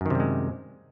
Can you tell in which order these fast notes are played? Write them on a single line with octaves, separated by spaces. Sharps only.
F#2 D#3 C3 G3 G#3